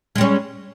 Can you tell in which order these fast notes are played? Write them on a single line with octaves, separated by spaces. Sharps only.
G#3 G3 C#4